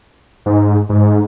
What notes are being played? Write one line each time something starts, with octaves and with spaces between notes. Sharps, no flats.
G#2
G#2